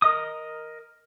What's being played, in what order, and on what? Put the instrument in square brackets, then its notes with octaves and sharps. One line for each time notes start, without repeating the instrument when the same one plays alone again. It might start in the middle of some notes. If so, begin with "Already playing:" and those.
[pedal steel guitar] A#4 D#5 D#6